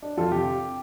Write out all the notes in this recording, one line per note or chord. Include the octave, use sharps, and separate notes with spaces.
D4
F2 F4 A4
C3 G4